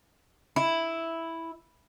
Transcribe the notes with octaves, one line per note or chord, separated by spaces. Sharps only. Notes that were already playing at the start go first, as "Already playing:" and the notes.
E4